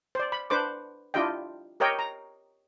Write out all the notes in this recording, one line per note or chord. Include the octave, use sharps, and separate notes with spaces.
C5 D5
B5
D4 B4 C5 D6
D4 E4 F4 G4 D#5 G5
G4 A#4 C#5 D#5 G5
A#5